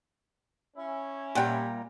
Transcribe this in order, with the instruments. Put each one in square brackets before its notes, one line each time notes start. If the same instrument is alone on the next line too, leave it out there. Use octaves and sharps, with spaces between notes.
[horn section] C#4 E4
[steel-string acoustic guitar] A#2 G3 A#5 [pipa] D5 F#5 G5